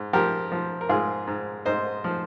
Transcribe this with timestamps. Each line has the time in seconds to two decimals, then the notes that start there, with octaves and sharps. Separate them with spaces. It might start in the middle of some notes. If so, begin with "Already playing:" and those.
Already playing: G#2
0.13 F3 G4 A#4
0.52 F3
0.81 A#4
0.89 G#2 F4 G#4
1.27 G#2
1.65 G#2 C5 D#5
2.04 F3